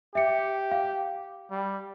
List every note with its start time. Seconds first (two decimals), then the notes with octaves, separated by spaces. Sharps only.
0.15 G4 E5 C#7
0.71 F5
1.51 G3